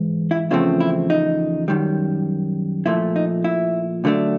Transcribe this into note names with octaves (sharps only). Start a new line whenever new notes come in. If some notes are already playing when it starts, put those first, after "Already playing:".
Already playing: G#2 E3 G#3
E4
E2 C#3 F3 A3 C4 E4
E4
D#4
F#2 D#3 G3
A#2 F3 A3 E4
D#4
E4
D2 D3 F#3 A3 D4